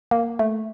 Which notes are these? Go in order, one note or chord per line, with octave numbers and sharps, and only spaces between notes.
A#3
A3